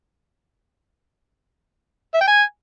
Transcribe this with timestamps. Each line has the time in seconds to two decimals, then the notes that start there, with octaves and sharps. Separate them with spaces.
2.14 E5
2.21 G5
2.28 G#5